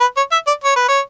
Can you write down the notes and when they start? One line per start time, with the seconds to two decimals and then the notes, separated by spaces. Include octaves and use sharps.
0.01 B4
0.17 C#5
0.32 E5
0.47 D5
0.64 C#5
0.76 B4
0.88 C#5